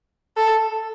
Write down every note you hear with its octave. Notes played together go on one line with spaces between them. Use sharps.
A4